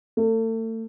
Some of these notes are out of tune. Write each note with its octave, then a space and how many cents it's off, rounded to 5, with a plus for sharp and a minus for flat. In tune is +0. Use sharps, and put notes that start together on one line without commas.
A3 +35